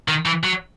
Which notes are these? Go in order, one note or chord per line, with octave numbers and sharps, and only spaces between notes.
D#3
E3
F#3